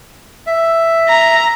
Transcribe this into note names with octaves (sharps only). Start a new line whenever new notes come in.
E5
A#5